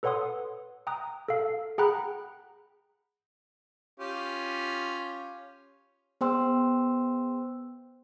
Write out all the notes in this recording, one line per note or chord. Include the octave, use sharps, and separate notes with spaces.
A4 B4 C#5 F#5 C6 D#6
G5 A#5 D#6 F#6
A4 F5
G#4 F#5 G5 A#5 B5 F#6
C#4 F4 G4
B3 G#4 C5 G5 C6 E6